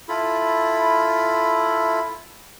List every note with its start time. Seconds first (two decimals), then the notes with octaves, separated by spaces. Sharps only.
0.08 E4 F4 A4 B5